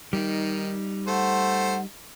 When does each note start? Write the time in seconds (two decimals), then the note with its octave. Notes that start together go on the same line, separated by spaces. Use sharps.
0.13 D#3 G3 D#4
1.07 A3 C5 F#5